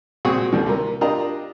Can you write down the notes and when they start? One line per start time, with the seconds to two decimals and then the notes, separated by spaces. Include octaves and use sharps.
0.25 A#2 C4 F#4 G#4 C#6 D#6
0.52 D#2 D3 E3 G3
0.66 C3 A#4
1.01 D4 F4 G4 A#4 D#5 A#5